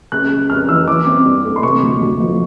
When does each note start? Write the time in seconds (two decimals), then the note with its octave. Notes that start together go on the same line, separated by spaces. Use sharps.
0.12 C#3 F#6
0.30 G#3
0.49 F2 F6
0.69 E3 E6
0.88 E3 D6
1.07 C4
1.26 G2
1.45 A3
1.56 C6
1.63 C3 C#6
1.83 D2
2.01 D2
2.20 F3